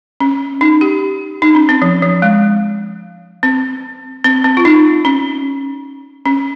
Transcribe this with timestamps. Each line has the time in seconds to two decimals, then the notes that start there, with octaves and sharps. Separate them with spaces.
0.20 C#4
0.61 D#4
0.81 G4
1.42 D#4
1.55 C#4
1.69 C4
1.82 F3
2.02 F3
2.22 G#3
3.43 C4
4.24 C4
4.44 C4
4.57 F4
4.65 D#4
5.05 C#4
6.26 C#4